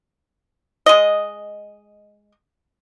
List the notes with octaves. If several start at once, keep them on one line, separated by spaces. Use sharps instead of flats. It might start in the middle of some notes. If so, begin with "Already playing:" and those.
G#3 D#5